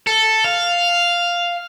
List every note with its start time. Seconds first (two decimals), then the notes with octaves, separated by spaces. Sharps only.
0.07 A4
0.44 F5